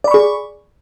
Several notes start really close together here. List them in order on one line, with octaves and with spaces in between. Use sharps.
D5 B5 C#6 G#4